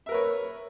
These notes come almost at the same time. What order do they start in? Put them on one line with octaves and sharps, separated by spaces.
E5 A#4 B4 C#5